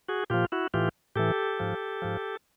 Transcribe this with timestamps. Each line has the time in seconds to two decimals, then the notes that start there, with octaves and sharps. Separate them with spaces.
0.09 F#4 G#4
0.30 A#2 F3 F4 G4
0.52 E4 F#4
0.74 A2 E3 F4 G4
1.16 A2 E3 G4 A4
1.60 G#2 F3
2.02 G#2 F3